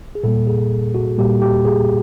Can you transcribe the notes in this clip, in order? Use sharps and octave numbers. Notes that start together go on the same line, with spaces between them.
G#4
A#2 G3 A#3 A4
G#4
F#4
A#2 G3 A#3 G4
G4
G#4